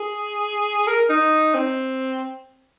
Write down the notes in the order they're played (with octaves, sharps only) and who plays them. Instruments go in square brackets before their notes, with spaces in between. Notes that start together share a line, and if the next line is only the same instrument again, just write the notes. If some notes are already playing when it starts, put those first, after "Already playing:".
Already playing: [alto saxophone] G#4
A#4
D#4
C4